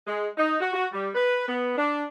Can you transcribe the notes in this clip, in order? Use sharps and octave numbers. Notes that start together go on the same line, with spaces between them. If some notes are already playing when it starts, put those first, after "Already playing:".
G#3
D#4
F#4
F#4
G3
B4
B3
D4